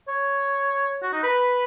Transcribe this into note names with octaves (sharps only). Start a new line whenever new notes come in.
C#5
F#4
D#4
B4